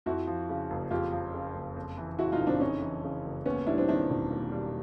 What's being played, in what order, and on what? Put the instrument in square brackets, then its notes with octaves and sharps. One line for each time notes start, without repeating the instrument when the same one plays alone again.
[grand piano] F2 [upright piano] E4 F#4
[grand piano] F3
C#3
F#1
[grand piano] F2 [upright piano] F4 G4
[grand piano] F3
C#3
F#1
F2
E3
[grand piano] C#3 [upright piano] E4 F#4
[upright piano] D#4 F4
[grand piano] F#1
[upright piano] C4 D4
[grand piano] F2 [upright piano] C#4 D#4
[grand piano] E3
C#3
F#1
[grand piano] D#2 [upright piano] B3 C#4
[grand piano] G3 [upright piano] D4 E4
[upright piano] C4 D4
[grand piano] D#3 [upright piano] D4 E4
[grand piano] E1
D#2
G3